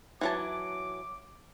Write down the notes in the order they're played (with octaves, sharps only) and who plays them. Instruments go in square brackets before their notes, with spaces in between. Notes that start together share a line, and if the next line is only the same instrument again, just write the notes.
[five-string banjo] E3 F#3 A5 [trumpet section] D6